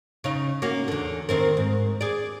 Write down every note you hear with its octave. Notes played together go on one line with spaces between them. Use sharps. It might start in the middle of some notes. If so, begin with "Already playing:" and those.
C#3 D#4
A#3 C#4 F#4
E2 D3
D#3 C4 A#4
G#2
G#4 D5